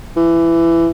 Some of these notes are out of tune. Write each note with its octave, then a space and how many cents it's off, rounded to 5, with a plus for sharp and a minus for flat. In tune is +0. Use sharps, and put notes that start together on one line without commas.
E3 +20